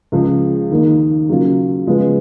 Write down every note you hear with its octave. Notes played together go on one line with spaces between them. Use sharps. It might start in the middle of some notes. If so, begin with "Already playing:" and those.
C#2 C#3 F3
D#2 D#3 A#3 D#4
C#3 F#3 A#3 C#4 F4
C#3 F3 G#3 B3 F4